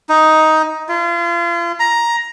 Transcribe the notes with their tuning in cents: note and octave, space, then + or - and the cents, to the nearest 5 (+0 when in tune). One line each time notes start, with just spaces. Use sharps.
D#4 +10
F4 -35
A#5 +10